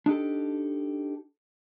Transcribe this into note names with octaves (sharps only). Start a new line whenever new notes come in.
D4 D#4 G4 A4